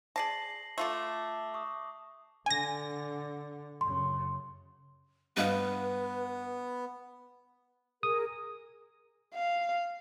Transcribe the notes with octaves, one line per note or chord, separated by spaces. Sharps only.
G#4 D5 A5 A#6 C7 F#7
A3 F4 A4 A5 D6
C#6 D#6
D3 G#5 A#6
F#2 C#3 C6
G2 B3 B4 D#5 F5
G#4 A#4 D#6
F5